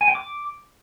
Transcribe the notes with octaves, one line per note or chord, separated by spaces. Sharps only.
G#5
G5
D6